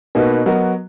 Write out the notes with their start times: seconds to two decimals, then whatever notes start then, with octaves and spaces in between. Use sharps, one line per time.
0.15 B2 A#3 D#4 F#4 B4
0.46 F#3 B3 F#4 A#4 D#5